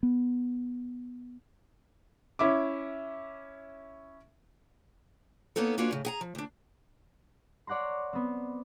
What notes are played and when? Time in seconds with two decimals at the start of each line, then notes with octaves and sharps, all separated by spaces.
0.03 B3
2.39 C#4 E4 E5 D6
5.56 A#3 B3 C#4 D#4 A4
5.78 A#3 C#4 D4 F4 F#4 B4
5.91 A2 C#3
6.05 G#4 F#5 A#5
6.21 F3
6.35 D2 D4
7.67 C#5 D5 F#5 A#5 C6
8.13 B3 C4